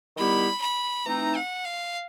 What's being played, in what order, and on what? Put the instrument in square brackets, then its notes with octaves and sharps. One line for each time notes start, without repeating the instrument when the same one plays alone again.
[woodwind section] D#3 G3 B3 E4 G4 [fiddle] B5
[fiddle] B5
[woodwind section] E3 A3 C4 D#4 [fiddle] A#5
[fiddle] F#5
F5